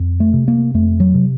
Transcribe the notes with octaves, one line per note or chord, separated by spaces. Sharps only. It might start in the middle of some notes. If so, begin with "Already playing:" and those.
Already playing: F2
A3
C3
A#3
F2 A3
F#3
C3